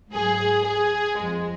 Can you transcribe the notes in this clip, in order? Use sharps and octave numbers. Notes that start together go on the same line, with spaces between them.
G#2 F#3 G#4
G#4
F2 F3 G#3